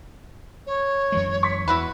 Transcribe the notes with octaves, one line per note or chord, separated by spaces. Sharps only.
C#5
F#2 E3 G#3
C#6 B6
E2 E4 F#4 B4